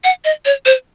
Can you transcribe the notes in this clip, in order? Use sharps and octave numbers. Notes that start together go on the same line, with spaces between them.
F#5
D#5
C#5
C5